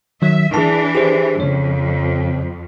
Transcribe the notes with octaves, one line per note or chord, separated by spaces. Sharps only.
D#3 F#3 E5
E3 D4 G#4 A5
G4 G#4 C5
F2 C#3 C#5